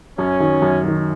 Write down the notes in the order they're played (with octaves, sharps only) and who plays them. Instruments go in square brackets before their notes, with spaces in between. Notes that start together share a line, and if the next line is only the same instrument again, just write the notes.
[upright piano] F#2 [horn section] C#4
[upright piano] D#3 F#3
F#2
D#3 F#3